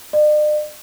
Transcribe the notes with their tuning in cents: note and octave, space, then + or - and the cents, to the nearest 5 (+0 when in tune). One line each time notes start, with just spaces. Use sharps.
D5 +45